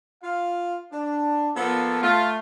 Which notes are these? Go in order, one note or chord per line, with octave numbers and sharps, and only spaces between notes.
F4 F5
D4
A#2 F3 B3 A4
A3 F4